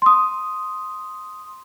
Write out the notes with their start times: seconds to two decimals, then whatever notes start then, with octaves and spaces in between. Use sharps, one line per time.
0.02 C6 D#6